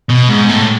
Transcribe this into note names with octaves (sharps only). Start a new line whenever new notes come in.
B2
G#2
A2